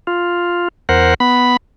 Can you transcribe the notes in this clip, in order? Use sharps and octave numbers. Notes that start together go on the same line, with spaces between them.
F4
E2 A#4 C5 F#5
B3 B5